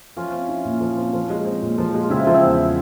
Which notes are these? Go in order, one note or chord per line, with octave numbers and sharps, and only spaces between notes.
F3 C#4 F4
C4
E4
A#2
F3
C4
F3
G#3
C4
A#2
F3
G#3
F4
C#3 C4 E4
F3
C4 E4
E2